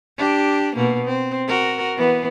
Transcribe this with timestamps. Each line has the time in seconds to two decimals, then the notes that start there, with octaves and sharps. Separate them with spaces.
0.18 D4 G4
0.76 B2 A#3
1.05 C4
1.47 F#4 A#4
1.97 E3 B3